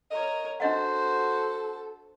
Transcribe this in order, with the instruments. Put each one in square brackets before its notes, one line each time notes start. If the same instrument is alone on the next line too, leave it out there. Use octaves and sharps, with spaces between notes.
[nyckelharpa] A#4 C#5 [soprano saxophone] D#5
[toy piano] D4 D#5 F#5 [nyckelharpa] F#4 C5 [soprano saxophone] A4